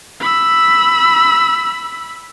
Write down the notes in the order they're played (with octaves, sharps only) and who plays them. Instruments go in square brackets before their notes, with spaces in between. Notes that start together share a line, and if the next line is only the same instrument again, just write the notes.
[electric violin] B5 E6